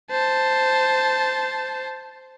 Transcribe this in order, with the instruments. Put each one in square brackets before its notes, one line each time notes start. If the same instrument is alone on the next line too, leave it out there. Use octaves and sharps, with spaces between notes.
[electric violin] C5 A5